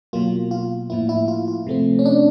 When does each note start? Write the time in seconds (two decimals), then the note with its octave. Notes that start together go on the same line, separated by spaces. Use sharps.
0.13 B2 F#3 A#3 F4
0.51 F4
0.90 A2 F3 A#3 E4
1.09 E4
1.28 F4
1.48 F4
1.67 C3 F3 A3 C4
1.99 C#4
2.06 D4